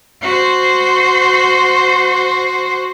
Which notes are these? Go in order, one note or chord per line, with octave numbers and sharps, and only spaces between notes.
F#4 C5